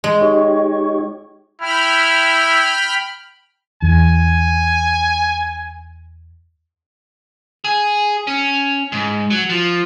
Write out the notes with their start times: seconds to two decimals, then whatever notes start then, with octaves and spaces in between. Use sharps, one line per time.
0.04 G#3
0.21 D#4 G4 C#5
1.61 E4 G5 B5 F6
3.82 E2 G#5
7.64 G#4
8.27 C#4
8.92 G#2
9.30 F#3
9.50 F3